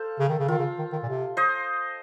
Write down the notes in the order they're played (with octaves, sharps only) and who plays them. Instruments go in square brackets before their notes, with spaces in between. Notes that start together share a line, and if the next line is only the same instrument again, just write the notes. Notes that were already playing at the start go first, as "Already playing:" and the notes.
Already playing: [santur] A4 C5 F5
[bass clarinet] C#3
D#3
C#3
[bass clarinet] D#3 [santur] F4
[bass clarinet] C#3
D#3
D#3
A#2
C3
[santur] C5 D#5